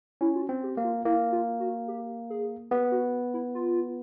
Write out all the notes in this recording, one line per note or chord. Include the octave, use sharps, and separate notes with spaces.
C#4 E4
F4
F#4
C4
G4
A#3
F4
A#3 E4
F4
F#4
G4
G#4
B3 G4
F#4
E4
F4